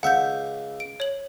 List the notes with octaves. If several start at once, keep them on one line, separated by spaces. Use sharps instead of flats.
C#2 E5 F#5 G6
D7
C#5 F#7